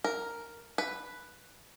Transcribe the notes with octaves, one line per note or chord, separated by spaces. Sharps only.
A#4
B4